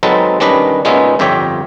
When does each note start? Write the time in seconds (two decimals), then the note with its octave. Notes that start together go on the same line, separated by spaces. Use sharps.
0.03 F#3 G#3 C4 D#4 A4 B4
0.40 D#3 G3 C#4 D4 B4 D#5
0.85 A#2 G#3 B3 C#4 D#4 E5
1.19 G1 F2 G4 C#5 E5 G5